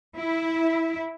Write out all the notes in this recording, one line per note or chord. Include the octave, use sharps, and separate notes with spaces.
E4